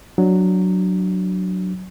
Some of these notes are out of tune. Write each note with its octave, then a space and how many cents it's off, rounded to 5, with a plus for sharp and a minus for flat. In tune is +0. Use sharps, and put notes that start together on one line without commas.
F#3 +0 D4 +0